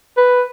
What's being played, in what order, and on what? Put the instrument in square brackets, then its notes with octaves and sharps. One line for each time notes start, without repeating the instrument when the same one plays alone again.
[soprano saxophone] B4